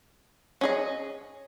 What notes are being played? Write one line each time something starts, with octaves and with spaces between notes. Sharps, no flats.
C#4 G#4 D#5